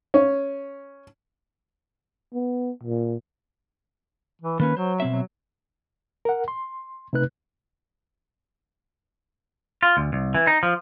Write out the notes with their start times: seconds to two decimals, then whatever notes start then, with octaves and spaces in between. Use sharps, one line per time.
0.14 C#4
2.34 B3
2.83 A#2
4.41 E3
4.59 D#3 A#3 C#4 B4
4.77 F#3 C5
5.00 B2 C4 E5
5.12 F#3
6.25 A#4 F#5
6.48 C6
7.13 C3 A3 D#4 B4 F#6
9.83 F4
9.97 D2
10.13 C2
10.35 E3
10.47 D#4
10.63 F3